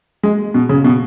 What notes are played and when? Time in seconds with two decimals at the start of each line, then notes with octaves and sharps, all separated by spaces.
0.23 G#3
0.54 B2
0.69 C#3
0.84 B2